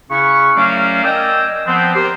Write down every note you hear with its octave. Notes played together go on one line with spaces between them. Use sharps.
C#3 C#4 E4 F#4 C#6
F#3 A3 C#4 A#4 D5 F5
A#4 D5 D#5 G5 G#5 E6
F3 B3 C4
G4 A#4 C5